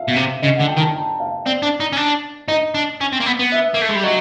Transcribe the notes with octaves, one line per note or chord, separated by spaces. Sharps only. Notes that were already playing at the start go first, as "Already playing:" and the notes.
Already playing: E5 F5
B2
C3
C#3 D#5
F#5
D3
G5
D#3
A5
A#5
F5
C4 D5
D4
D#4
C#4
D4
D#4 D#5
D4
C#4
C4
A#3
B3
B3
E5
A#3
A3
G#3
G3
F#3 D#5